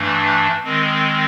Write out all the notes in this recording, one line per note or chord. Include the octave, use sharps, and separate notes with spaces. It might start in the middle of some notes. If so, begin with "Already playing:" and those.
Already playing: G2 E3 A3 D4
D#3 G#3 C4